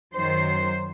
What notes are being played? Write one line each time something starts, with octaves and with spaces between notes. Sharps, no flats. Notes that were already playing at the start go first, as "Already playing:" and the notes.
F#2 D#3 F#3 C5